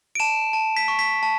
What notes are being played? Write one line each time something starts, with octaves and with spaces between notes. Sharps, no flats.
D7
A5 E7
A5
B6
C#6
B6
A5